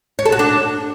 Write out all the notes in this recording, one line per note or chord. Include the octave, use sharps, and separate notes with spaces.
C#5
A4
F#4
D4